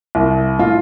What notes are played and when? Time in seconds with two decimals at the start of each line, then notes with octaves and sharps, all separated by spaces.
0.15 C2
0.59 A2 F4